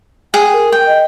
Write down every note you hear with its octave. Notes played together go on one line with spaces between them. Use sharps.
G#4 G5
A#4
G5
D#5